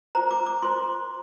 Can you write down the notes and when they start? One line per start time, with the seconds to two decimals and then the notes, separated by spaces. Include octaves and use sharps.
0.15 F4 C5 A#5
0.31 D6
0.46 D6
0.62 F4 C5 C6